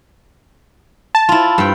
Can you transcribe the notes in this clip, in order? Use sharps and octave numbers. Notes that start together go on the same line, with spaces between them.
A5
E4 F4
G2 G5